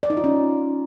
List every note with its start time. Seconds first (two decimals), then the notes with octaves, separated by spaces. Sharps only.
0.03 D5
0.10 D#4
0.17 F4
0.24 C#4